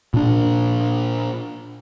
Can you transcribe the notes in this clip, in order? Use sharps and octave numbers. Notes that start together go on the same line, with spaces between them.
A#2 D4